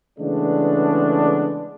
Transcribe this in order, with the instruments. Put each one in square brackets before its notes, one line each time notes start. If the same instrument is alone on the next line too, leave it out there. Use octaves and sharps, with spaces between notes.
[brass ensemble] C#3 E3 G#3 A3 B3 D4